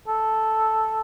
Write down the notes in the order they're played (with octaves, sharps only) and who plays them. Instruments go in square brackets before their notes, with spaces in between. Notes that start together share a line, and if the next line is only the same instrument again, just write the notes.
[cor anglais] A4